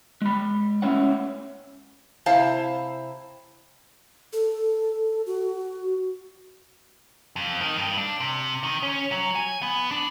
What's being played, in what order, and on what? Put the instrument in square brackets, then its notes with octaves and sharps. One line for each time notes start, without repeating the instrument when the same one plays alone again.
[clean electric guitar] G#3 B5
A3 C#4 E4 C#5 F#5
[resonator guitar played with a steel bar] C3 E4 C5 F5 A5 A#5
[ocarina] A4
F#4
[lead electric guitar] F2
D#3
G2
D4
C3
D#3
C#4
F#3
G#5
B3
D4